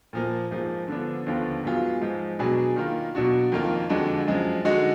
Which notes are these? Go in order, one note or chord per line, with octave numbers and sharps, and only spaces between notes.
A#2 F3 A#3
G#2 F3 A#3
D3 F3 B3 D4
D#2 D3 F3 B3 F4
G#2 F#3 B3 F4 G#4
G#2 F3 G#3
B2 F#3 D4 G#4 B4
D#3 A#3 F4
B2 F#3 D4 F#4
F2 D#3 A#3 F4
F2 D3 G#3 D4 F#4
F#2 F3 G#3
D3 G#3 D#4 F#4